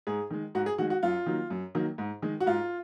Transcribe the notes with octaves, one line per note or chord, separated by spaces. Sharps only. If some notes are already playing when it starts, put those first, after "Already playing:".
G#2 G#4
D#3 G#3
G#2 F#4
G#4
D#3 G#3 F#4
F#4
F#2 F4
D#3 F#3 A#3
F#2
D#3 F#3 A#3
G#2
D#3 G#3
F#4
G#2 F4